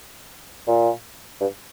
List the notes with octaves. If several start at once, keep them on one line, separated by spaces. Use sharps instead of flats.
A#2
G2